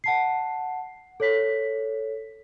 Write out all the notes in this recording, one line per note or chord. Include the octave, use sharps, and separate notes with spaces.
F#5 A5 C7
A4 C#5 B6